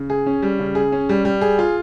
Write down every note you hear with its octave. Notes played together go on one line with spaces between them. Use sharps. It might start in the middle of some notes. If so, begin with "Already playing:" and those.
Already playing: C#3
G#4
C#4
G3
C#3
G#4
C#4
G3
G3
G#4
F4